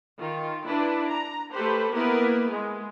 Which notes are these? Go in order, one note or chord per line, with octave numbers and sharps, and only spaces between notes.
D#3 F4
D4 E4 B4
A#5
A3 G4 A4 B4 C5
A#3 B3 E4 A#4 B4
G#3